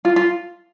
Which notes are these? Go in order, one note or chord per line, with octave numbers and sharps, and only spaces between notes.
F4
F4